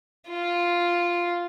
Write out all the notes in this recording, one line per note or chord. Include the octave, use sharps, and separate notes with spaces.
F4